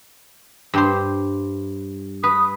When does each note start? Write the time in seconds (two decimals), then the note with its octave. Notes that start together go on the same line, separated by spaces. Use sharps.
0.74 G2 G4 C5
2.23 B4 D#6